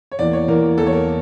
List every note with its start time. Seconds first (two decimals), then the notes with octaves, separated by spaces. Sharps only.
0.12 C#5
0.19 E2 E3 A#3 D5
0.33 C#5
0.48 E2 E3 A#3 A#4
0.78 E2 E3 A#3 A4
0.87 C#5
0.93 A#4